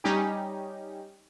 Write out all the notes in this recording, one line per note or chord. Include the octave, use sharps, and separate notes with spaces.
G3 C#4 D#4 G4